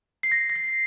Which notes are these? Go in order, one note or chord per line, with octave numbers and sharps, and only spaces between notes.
C7
A#6
A#6
C7